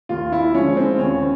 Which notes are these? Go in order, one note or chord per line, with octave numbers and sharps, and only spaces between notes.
D#2 F4
E4
D3 F3 G#3 C#4
C4
D#2 C#4